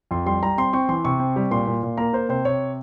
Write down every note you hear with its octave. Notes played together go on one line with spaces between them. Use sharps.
F2 C6
G3 C6
G3 A#5
C4 C6
C4 C#6
E3 C6
C3 C#6
C4
G3
A#2 C6
A#2
A#2
A#3 A#5
A#3 C5
C3 C5
C3 C#5